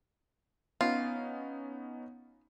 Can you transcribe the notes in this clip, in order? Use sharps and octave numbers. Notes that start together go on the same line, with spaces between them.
B3 C#4 D#4 F4